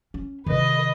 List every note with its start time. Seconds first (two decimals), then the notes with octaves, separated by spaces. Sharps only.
0.14 C#4
0.46 C3 D#3 B4 D#5